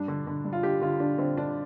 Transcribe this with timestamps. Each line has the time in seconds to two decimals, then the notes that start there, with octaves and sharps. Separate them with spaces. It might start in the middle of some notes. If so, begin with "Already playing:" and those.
Already playing: G2 D4
0.08 D3
0.27 D3
0.45 G2
0.53 F4
0.63 D3 G4
0.81 D3 F4
1.00 D3 D4
1.18 D3 C4
1.37 D3 D4